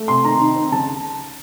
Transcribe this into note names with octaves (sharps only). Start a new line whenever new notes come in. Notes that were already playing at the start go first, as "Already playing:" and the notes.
Already playing: A3
C3 C6
D#3 A#5
D#4
C4
C#3 A5